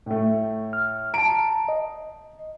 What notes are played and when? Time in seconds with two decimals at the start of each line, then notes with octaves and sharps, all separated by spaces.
0.06 A2 A3
0.73 F6
1.14 A5 A#5 D7
1.68 D#5